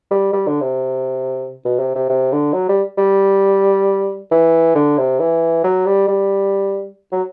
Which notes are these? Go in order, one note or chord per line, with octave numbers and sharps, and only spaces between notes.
G3
G3
D3
C3
B2
C3
C3
C3
D3
F#3
G3
G3
E3
D3
C3
E3
F#3
G3
G3
F#3